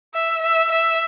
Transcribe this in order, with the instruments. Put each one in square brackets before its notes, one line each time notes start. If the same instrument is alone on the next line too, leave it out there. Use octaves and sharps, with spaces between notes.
[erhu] E5
E5
E5